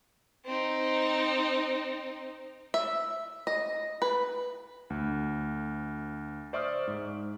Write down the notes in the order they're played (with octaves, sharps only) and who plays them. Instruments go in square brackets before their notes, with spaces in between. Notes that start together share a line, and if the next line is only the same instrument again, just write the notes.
[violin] C4 D#4
[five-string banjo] E5
D#5
B4
[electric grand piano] D2
C5 D5 E5 C#6 D#6 F6
G#2